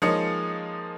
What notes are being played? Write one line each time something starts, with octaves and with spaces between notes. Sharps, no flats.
F3 G#3 A#3 D#4 C#5 C#7